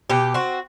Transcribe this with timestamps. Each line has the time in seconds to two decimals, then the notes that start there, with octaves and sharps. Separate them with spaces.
0.10 B2 G4
0.34 C4 F#4